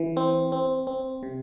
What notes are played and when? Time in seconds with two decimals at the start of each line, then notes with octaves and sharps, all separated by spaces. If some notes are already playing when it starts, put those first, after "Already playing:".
Already playing: E3
0.17 C4
0.52 C4
0.87 C4
1.23 C3